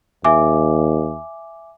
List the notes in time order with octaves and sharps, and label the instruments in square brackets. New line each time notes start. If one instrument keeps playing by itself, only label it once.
[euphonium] D#2 [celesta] E5 G#5 D6